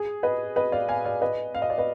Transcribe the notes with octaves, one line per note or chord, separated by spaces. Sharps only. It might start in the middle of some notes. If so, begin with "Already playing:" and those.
Already playing: G#4
B4 D#5
B4 D#5
D5 F5
F5 G#5
D5 F5
B4 D#5
F5
D#5
D5
B4 D#5